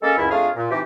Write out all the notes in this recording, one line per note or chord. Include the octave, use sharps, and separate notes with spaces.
G#3 A#3 C#4 A4
C#2 F#2 C#4 E4
F2 A3 D4 F4 G#4 F5
A#2
C3 E3 D#4 F#4 G4